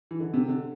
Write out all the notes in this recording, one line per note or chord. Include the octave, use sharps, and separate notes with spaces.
E3
D3
C3
D3